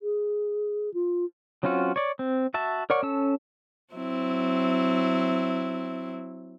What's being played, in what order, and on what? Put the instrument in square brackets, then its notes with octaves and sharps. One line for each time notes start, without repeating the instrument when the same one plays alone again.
[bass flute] G#4
F4
[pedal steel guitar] F#3 C4 C#4 F4 F#4
C#5 D5
C4
F#4 E5 A5
A#4 C#5 D5 F#5 C#6
C#4 A4 A5 E6
[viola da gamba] F#3 C4 E4